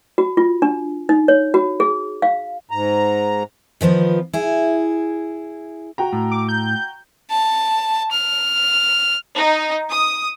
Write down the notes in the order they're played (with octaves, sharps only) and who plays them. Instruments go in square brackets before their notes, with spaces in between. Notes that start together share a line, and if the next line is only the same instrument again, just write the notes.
[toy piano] F#4
F4
D4
D#4
C#5
F#4
G#4
F5
[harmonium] G#2 A#5
[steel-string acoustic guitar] D#3 F3 B3 F4
E4 G#4
[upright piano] F#4 G5 A#5
[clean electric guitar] A2
[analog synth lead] D6
G6
[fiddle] A5
F6
[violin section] D#4
D#6